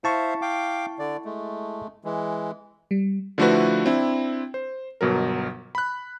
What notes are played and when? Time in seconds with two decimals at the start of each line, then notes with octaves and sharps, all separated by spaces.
0.04 E4 C5 E5 F5 A5 C#6
0.42 F5 G5 D6
0.99 D3 D5
1.25 G#3 A3
2.04 E3 G#3
2.91 G3
3.38 D3 F3 A3 E4 F#4 B4
3.86 C4 D4 E4
4.54 C5
5.01 G1 B2 F#3 A#4
5.75 B5 F#6